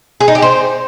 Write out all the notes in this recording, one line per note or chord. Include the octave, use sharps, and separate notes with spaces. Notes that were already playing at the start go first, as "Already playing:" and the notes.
G#4
D#4
G4
C5